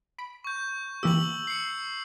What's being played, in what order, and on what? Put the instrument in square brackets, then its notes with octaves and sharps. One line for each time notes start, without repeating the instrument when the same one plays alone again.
[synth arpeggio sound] B5 D7
[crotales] C#6 G6
[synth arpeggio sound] E3 A#3 G4 [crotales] E6 F#7
[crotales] C7 C#7